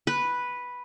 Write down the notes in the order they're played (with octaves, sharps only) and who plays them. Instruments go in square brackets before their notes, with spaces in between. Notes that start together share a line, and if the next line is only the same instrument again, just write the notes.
[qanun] B4